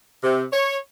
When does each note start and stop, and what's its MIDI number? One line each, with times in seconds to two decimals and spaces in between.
0.23 0.43 48
0.53 0.77 73